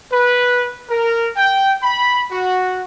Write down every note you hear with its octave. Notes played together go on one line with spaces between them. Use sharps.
B4
A#4
G5
B5
F#4